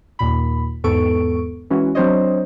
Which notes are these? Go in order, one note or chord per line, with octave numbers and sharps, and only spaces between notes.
D#2 A#2 B5
E2 G#2 B3 A4 C#6 D7
E3 G#3 C#4 E4 F#4
F#3 C4 D4 C5 C#5 D#5